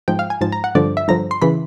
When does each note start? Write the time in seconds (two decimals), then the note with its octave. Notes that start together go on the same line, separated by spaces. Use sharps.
0.08 G#2 F3 G5
0.19 F5
0.30 G#5
0.41 G#2 F3 A5
0.52 A#5
0.64 F#5
0.75 G2 D3 F3 D5
0.97 E5
1.08 G2 D3 F3 A#5
1.31 C6
1.42 C#3 E3 B5